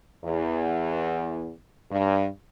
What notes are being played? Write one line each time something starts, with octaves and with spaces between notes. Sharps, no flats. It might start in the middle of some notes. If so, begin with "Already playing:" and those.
E2
G2